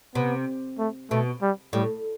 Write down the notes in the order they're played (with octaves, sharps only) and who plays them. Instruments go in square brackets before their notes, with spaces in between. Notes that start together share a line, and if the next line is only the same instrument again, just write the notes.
[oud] C3 [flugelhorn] B3
[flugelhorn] A3
[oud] B2 [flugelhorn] A3
[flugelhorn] G3
[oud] A2 [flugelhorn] G3